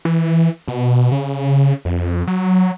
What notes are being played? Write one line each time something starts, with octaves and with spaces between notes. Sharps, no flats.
E3
B2
C#3
F2
F#3